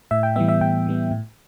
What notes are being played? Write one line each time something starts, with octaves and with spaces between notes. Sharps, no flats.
A2 E5
G5
E3 G3 B3 E5
E5
A2 G5
E3 G3 B3
A2